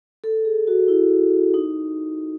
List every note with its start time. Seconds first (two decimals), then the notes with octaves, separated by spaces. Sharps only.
0.24 A4
0.45 G#4
0.67 F#4
0.88 E4
1.54 D#4